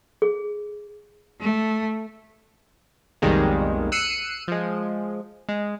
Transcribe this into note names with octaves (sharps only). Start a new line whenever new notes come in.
G#4
A3
B1 F2 D#3 G3 G#3 A#3
E6 F#6 C7 C#7 D#7
F3 G#3
G#3